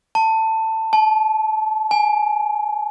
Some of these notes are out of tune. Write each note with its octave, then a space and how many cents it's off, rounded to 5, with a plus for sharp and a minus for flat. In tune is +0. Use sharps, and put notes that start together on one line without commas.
A5 +15
A5 -25
G#5 +10